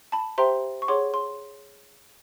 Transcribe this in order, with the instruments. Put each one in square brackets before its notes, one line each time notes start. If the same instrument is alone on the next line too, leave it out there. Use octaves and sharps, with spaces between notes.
[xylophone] A5 B5
G4 C5 E5 G5 A#5 C6
C#6
G#4 C#5 F#5 C6 D6
C6